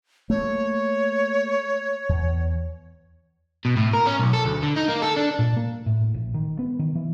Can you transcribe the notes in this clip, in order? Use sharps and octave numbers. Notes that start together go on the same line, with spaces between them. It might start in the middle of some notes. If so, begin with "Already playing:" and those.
A3 A#3 C#5
E2
B2
A2
A#4
C#4
B1
A4
D2
D3
D#4
A#3
A4
D4
A#2
A#3
A2
A#1
D#3
B3
D#3
E3